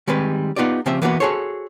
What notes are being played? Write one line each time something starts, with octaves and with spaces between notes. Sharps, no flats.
D#3 G3 G#3 C4 B4
B3 D#4 F4 G4 D5
C#3 F3 C4 G4 E5
E3 A#3 B3 D4 D#4 F#4
F#4 G#4 A4 C5 C#5